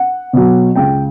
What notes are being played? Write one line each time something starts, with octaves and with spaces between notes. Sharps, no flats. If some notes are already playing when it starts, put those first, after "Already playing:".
Already playing: F#5
B2 F#3
C#2 G5